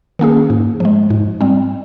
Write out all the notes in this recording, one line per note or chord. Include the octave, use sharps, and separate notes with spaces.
D#3 A#3 C#4 G#4
G#2
F3 G#3
G#2
G3 C4